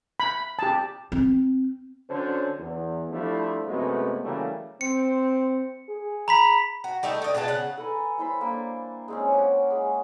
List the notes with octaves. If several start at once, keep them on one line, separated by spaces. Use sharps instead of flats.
B5
G4 A5
C4
D3 F#3 C#4 C5
E2
F3 G3 A3 D4 E4
F#2 C3 G#3 A3 B3
C#3 E3 F#3 G3 A3 A#3
C4 C#7
G#4
A#5 B5 B6
F#4
G3 A3 D#4 E5
D3 D#5
B2 G#3 F4 A5
C#3 F#5
A4 B4 G#5 A#5
G3 E4 C5 B5
A#3 D4
G#3 C4 C#4
G4 C#5 F#5
G#3